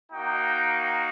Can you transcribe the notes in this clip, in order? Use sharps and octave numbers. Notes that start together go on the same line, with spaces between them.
A#3 D#4 F#4 G5